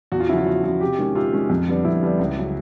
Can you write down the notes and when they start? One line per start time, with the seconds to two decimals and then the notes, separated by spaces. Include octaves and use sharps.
0.12 E2 F#4
0.20 F4
0.29 C#3 F3 E4
0.38 F4
0.46 E2 F#4
0.64 C#3 F3 F#4
0.81 C3 G4
0.99 D#3 G#3 C#4
1.15 C3 F4
1.33 D#3 G#3 C#4
1.50 F2
1.68 D3 G3 B3 D4
1.85 F2 E4
2.02 D3 G3 B3 D4
2.19 C#2
2.36 C#3 F#3